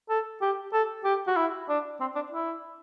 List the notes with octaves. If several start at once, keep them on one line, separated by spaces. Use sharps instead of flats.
A4
G4
A4
G4
F#4
E4
D4
C4
D4
E4